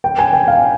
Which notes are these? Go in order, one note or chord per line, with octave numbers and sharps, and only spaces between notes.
G5
G#5
G5
F5